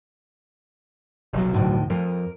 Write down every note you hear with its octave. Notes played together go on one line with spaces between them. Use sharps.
F1 B1 F#3
D2 A2 D#3
F2 A#4